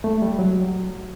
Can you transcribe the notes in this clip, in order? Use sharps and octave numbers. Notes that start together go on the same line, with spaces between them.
A3
G3
F#3